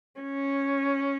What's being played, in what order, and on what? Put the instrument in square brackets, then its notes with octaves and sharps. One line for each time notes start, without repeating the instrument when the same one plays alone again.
[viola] C#4